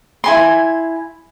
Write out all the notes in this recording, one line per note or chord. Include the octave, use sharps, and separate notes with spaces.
E4 G#5 C6